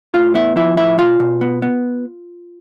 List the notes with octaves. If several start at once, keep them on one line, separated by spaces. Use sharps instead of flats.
A2 F4 F5
B3 E4 E5
F3 E4 E5
A2 E4 E5
B2 F4 F5
B2
B3
B3